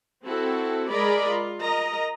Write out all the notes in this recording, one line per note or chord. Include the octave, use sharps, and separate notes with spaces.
C4 E4 F#4 A4
G#3 G#4 A#4 D5 D#5 B5
F4
A#4 D#5 A#5